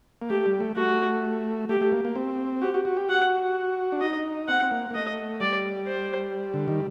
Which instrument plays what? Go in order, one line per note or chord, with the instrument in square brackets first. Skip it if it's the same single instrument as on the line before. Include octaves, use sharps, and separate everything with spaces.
[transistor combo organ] A#3
[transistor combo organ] A3 [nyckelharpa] G4
[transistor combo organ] G3
A3
[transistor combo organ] A3 [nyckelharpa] F#4
[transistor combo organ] A3 [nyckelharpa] G4
[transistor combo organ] A3
A#3
A#3
C4
[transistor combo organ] F#4 [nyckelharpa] G4
[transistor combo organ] F#4
F#4
G4
[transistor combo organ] F#4 [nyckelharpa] F#5
[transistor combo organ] D4
[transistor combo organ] D#4 [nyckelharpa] D#5
[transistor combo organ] C4 [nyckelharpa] F#5
[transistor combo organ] C4
A#3
A#3
[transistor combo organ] A3 [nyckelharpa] D#5
[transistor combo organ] G3 [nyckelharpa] D5
[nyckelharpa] C5
[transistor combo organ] D3
D#3